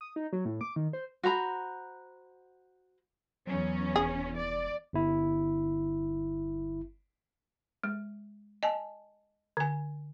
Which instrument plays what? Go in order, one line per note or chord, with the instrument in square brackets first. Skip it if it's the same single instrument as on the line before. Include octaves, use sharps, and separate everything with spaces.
[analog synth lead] D#6
D#4
F#3
A2
D6
D#3
C5
[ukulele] F#4 C5 A#5 B5
[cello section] E2 C#4 [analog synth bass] F#3
[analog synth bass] F1 [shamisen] G#4
[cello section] D5
[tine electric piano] G1 E4
[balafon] G#3
D#5 G#5 A5
D3 G#5